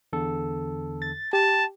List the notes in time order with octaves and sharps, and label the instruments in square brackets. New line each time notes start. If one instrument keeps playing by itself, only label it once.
[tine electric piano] E2 D3 A4
[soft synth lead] A6
[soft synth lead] G4 [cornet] A5